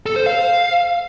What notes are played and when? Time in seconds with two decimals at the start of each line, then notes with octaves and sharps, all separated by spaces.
0.06 A4
0.16 C5
0.26 F5